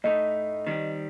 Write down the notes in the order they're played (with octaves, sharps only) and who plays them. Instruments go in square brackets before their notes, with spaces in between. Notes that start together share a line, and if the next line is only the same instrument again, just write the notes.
[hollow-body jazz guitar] A2 A3 D#4 [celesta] D#5
[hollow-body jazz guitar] D#3 G3 C4